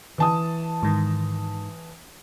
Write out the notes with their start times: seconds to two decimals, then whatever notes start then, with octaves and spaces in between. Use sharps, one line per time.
0.18 E3 A5 D#6
0.83 G#2 D#3